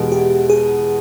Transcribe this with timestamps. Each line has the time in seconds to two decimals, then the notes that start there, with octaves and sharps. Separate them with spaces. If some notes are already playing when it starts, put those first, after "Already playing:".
Already playing: E2 B2 G#3 G4
0.12 G4
0.50 G#4